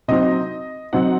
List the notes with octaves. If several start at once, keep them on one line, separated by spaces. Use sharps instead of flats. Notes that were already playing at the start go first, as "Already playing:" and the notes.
C3 F#3 C4 D#4 D#5
C3 F#3 C4 D#4 F#5